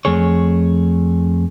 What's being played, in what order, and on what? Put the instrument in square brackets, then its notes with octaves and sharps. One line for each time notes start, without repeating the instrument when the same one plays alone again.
[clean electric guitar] F2 A3 G#4 C#5